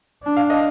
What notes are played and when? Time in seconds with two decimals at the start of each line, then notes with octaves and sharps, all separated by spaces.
0.23 D4
0.36 F5
0.50 D#5